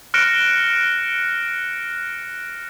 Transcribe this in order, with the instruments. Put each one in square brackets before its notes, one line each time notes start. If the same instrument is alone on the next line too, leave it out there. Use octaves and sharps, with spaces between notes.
[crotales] F6 F#6 A#6 C#7 D7 E7